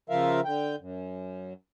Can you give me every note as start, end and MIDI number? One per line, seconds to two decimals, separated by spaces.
0.10 0.40 49
0.10 0.40 53
0.10 0.40 65
0.10 0.40 70
0.10 0.40 76
0.10 0.40 77
0.45 0.76 50
0.45 0.76 79
0.79 1.53 42